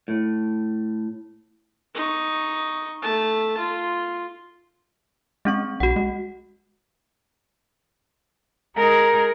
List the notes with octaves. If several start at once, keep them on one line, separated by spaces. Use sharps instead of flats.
A2
D#4 C#6
A3 A5
F4
G#3 C4 C#4 C#6
B1 F#4 F#5
G#3
G#3 D#4 G#4 A#4 A#5